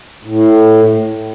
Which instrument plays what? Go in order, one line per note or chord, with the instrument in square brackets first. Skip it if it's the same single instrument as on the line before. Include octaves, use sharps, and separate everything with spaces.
[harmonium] A2